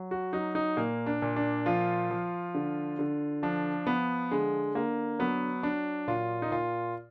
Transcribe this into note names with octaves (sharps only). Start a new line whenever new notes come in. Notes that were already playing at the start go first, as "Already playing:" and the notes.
Already playing: F#3
F#4
F#3 D#4
D#4
A#2 A#3
D4
A#2
D4
F3 F4
F3
D3
D3
F3 D4
F3 B3
D3 G#3
D3 A#3
F#3 B3
F#3 D4
A#2 F4
D#4
A#2 F4